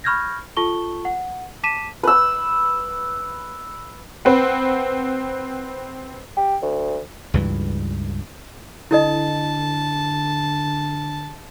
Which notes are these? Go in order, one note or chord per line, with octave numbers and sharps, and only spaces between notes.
B5 C#6 F6 G6 G#6 A#6
F4 A4 A5 C#6 G7
F#5
A5 D6 B6 D#7 E7
B4 E6
C4 B4 F#5
G4
D2
C#2 G2 E3
D3 E4 A4 D#5 A5